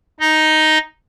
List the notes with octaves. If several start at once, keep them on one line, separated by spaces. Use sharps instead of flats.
D#4 D#5